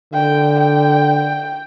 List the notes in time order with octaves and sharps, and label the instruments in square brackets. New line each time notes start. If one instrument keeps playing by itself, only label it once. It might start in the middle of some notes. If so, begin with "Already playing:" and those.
[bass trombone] D3 [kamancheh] G5
[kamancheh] G5